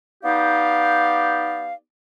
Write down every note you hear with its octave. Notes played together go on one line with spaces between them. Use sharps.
B3 D#4 G4 D5 F5